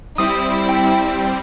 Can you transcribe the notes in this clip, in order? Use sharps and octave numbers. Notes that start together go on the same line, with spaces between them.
G3 C4 E4 D#6
G5